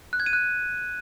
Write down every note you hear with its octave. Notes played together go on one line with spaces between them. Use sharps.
F#6
G#6
D#7
F#6